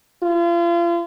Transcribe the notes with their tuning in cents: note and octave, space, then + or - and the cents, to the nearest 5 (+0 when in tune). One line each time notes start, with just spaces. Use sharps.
F4 -35